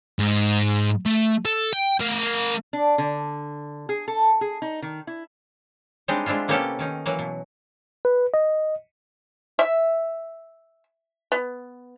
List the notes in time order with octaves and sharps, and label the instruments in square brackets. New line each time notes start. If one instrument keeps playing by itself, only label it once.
[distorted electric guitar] G#2
A3
A4
G5
A3 A#4
[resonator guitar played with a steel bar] D4
D3
G#4
A4
G#4
D#4
D#3
E4
[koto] G3 G#3 C4 D4 D#4
G#3 C4 D4 E4 F4
C3 A#3 B3 C#4 G4 A4
D#3 C#4 D#4
E3 F#3 A#3
B2
[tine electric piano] B4
D#5
[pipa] E5
B3